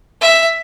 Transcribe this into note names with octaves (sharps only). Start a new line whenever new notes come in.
E5